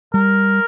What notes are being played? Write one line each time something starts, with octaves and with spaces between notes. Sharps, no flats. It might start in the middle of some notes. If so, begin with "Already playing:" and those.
G3 A#4